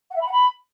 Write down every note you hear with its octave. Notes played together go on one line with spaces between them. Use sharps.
F#5
E5
B5
F#5
B5